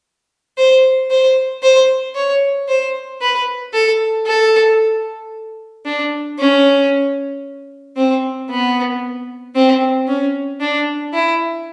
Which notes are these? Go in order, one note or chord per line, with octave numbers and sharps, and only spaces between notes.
C5
C5
C5
C#5
C5
B4
A4
A4
D4
C#4
C4
B3
C4
C#4
D4
E4